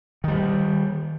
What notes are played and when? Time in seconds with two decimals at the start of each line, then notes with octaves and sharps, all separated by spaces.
0.24 D#3 G3